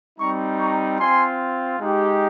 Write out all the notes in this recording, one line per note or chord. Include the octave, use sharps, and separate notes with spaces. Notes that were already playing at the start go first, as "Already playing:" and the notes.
G3 C4 D#4 A#5 C#6
A#5 C#6
C4 F4 G#5 C6
G#3 D#4 G4